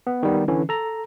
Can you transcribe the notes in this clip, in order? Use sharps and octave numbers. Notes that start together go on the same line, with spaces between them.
B3
D#3 G3 B3
D3 E3 C#4
A4 A#5